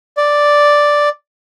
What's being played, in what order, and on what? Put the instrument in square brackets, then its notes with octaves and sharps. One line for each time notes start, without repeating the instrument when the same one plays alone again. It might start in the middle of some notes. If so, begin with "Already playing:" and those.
[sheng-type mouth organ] D5